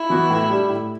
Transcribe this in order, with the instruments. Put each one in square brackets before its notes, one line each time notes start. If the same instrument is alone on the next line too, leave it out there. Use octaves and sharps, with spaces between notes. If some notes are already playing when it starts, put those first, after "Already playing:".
Already playing: [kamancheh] E4
[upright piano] E3 B3 F#4
A2
G3 D4 G4
A2